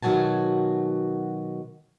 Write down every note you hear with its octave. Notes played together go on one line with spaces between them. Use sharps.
B2 D#3 F#3 F#4 G#5 A5